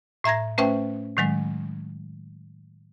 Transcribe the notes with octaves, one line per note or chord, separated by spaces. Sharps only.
A2 E5 A#5 G#6 A#6
A3 C#4 B4 C5 E5 G5
A2 D#3 F#3 G#3